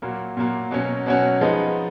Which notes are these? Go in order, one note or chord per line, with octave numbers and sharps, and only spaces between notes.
A#2 F#3 A#3
A#2 F#3 A#3
B2 F#3 C#4
B2 F#3 C#4
F3 G#3 B3 D#4